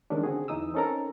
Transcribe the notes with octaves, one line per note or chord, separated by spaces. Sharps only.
D#3 G#3 C#4 D4
D3 C4 F#4 G#4
E2 E3 D#4 D#6 E6
C4 C#4 D#4 A4 A#4 A#5